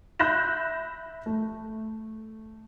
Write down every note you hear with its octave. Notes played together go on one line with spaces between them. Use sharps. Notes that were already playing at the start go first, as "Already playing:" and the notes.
E5 B5 F#6 G6 A#6 E7
A3